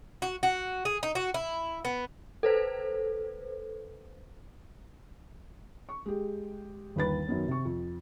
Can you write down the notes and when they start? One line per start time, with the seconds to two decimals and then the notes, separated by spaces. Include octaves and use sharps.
0.22 F#4
0.43 F#4
0.85 G#4
1.03 D#4
1.15 F#4
1.34 E4
1.85 B3
2.43 A4 B4 C5
5.89 C#6
6.06 G#3 G4
6.96 G1 D#2 B4 A6
7.27 F#2 D#3 B3 C#4
7.48 C3 C#6
7.65 F2